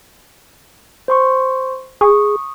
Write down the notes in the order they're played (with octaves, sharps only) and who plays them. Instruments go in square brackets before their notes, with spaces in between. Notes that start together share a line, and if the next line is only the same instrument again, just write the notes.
[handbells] C5 C6 C#6
[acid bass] G#4 [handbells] C#6 D#6